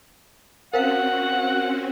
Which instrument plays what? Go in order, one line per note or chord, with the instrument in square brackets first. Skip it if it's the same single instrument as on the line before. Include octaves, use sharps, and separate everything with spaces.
[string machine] C4 C#4 F#4 [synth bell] A#4 C5 F5 [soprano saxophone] F#5